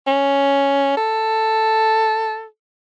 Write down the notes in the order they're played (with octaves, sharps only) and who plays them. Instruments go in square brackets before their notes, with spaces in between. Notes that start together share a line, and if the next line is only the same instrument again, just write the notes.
[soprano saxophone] C#4
A4